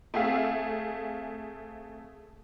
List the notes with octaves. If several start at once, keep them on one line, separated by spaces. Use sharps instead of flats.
A3 C4 G#4 E5 F5